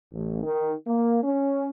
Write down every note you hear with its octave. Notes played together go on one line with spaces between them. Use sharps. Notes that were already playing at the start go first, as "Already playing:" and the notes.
A1
D#3
A#3
C#4